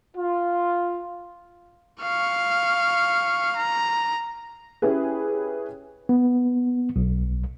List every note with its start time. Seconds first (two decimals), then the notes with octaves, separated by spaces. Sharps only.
0.17 F4
2.02 F5 C#6
3.57 A#5
4.82 C#4 E4 G4 G#4 B4
6.09 B3
6.96 B1